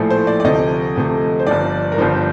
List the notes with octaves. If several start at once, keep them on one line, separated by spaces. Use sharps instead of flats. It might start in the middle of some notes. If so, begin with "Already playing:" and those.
Already playing: A#1 A2 F3 A3
C5
D5
D5
D2 C3 F3 A3 D#5
D2 C3 F3 A3
C5
G1 G2 F3 D5
A#4
G1 G2 F3 C5